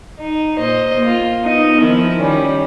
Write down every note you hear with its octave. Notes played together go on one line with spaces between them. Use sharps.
D#4
A#2 C5 D#5
A#3 F4
B3 D#4
D#3 F3 E4
D#3 G3 C#4